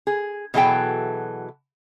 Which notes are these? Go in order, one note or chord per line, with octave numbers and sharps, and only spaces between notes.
G#4
B2 E3 F#3 G#4 A4 G5